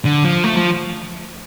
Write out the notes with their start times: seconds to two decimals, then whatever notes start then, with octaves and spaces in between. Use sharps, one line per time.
0.05 D3
0.25 F3
0.44 A3
0.57 F3